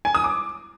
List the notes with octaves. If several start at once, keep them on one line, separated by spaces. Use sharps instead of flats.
G#5
D#6
D6